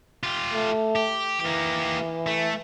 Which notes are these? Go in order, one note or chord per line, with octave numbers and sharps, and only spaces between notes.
F4 G4
A3
G4
E3 A#3 G4
A3